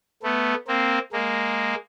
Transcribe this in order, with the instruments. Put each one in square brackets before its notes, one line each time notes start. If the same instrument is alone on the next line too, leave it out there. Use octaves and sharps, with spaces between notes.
[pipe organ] A3 B3
A#3 C4
G#3 A#3